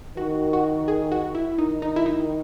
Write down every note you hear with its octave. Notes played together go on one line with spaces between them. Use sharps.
D#3 F#4
F#4
G#4
F#4
E4
D#3 D#4
D#4
E4
D#4